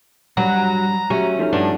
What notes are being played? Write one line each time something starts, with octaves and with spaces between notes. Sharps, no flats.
G2 F#3 A#5 B5 F#6
F#3 C#4 F#4 G4 E5
F3 A3 C#4 D#4
G2 D4 F#5